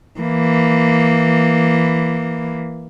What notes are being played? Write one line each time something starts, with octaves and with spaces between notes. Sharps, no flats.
E3 A#3